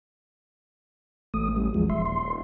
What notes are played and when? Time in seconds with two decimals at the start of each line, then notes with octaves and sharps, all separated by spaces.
1.34 A1 A3 D#6
1.56 G3
1.74 E2 F3 G#3
1.90 D#1 E5 C6
2.06 C6